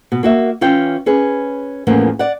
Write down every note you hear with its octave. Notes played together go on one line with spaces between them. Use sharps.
B2
A#3 F#4 E5
E3 C#4 F4 G5
C#4 G#4 B4
E2 A2 F3 A#3 B3 C#4
D5 F#5